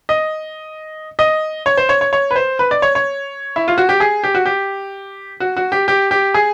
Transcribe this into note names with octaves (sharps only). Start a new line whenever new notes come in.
D#5
D#5
C#5
C5
C#5
C#5
C#5
B4
C5
B4
D5
C#5
C#5
E4
F4
F#4
G4
G#4
G4
F#4
G4
F#4
F#4
G4
G4
G4
G#4